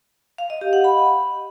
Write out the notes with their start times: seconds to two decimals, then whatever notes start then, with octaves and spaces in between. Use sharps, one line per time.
0.38 F5
0.50 D#5
0.61 G4
0.73 F#5
0.84 B5